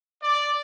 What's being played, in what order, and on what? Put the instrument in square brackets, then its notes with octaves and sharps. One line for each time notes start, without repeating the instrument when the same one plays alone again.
[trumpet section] D5